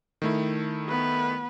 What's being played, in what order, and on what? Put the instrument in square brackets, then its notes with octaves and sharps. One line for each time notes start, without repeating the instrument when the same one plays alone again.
[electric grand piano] D#3 A3 E4
[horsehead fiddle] B3 B4